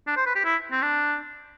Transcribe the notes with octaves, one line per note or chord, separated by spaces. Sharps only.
D4
C5
B4
G4
E4
C4
D4